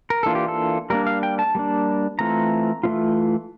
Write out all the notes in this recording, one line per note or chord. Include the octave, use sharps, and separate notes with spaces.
A#4
E3 A#3 D4 F4 A4
G4
A4
G3 A#3 D4 A#4
F5
G5
A5
G3 A#3 D4
E3 A3 C4 F4 A#5
E3 A3 C4 F4